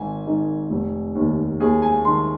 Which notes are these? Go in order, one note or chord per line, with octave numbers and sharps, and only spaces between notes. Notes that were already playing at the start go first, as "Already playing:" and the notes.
Already playing: G#1 G#5
G#2 D#3
F1
D#2 D#3
D#2 G#4
G#5
D#3 C6